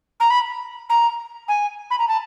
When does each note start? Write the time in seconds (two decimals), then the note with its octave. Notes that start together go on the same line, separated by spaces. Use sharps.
0.20 A#5
0.30 B5
0.90 A#5
1.48 G#5
1.90 B5
1.99 A#5
2.08 A5